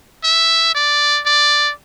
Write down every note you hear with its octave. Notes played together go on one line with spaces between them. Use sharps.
E5
D5
D5